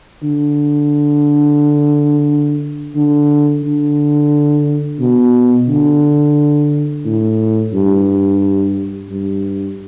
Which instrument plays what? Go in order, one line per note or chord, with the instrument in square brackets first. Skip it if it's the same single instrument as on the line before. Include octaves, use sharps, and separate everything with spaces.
[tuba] D3
D3
D3
B2
D3
A2
G2
G2